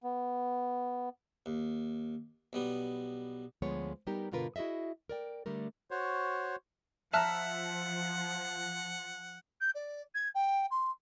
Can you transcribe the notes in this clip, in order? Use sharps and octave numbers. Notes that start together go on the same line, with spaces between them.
B3
D#2
B1 G3 B3
D2 F3 G#3 B3 F4 C#5
G3 B3 D#4 G4 A#4
G2 B2 D3 F4 A#4 B4
E4 F#4 G#4 D#5 E5
A#4 D5 G5
D3 G3 A3 A#4
F#4 C5 C#5
F3 E5 F#5 A5 A#5 F6 F#6
G6
D5
G#6
G5
C6